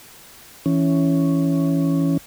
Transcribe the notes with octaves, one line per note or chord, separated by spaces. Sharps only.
E3 C#4